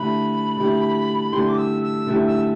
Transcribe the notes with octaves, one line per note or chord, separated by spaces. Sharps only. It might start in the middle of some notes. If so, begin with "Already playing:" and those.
Already playing: D3 A3 E4 G4 B5
D3 A3 E4 G4
D3 A3 E4 G4 C6
D6
E6
E6
D3 A3 E4 G4
E6